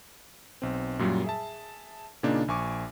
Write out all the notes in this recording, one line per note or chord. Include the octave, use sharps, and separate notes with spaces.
B1 C4
F#2 A#2 F#3 G3
G#4 E5 A5
A#2 C#3 A#3 D4 D#4
A#1 G#5 C#6 D6